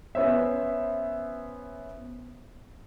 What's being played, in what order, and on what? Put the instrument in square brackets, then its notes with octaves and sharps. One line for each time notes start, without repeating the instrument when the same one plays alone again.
[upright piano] B3 C#4 C5 E5